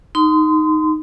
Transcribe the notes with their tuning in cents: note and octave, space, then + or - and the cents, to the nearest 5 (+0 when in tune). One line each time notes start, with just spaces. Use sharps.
D#4 +0 C6 -30